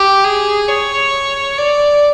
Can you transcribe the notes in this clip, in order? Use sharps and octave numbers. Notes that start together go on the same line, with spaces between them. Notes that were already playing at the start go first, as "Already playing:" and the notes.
Already playing: G4
G#4
C#5
D5